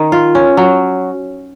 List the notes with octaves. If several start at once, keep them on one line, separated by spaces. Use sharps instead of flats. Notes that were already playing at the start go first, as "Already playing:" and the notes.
Already playing: D#3
F4
C#4
F#3